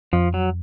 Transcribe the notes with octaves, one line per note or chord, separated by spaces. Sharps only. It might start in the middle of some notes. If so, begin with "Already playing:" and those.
F2 F3
F#3